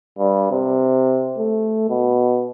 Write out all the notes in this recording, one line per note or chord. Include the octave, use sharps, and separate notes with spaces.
G2
C3
A3
B2